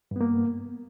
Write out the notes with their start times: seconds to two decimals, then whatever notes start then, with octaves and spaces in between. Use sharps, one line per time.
0.11 G2
0.16 B3
0.21 A#3